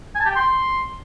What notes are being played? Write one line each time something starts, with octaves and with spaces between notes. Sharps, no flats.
G#5
A5
G4
G5
C6